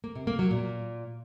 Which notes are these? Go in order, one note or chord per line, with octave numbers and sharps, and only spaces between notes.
A#3
C3
A#3
F#3
A#2